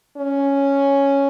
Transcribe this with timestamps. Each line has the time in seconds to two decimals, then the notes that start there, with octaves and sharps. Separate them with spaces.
0.17 C#4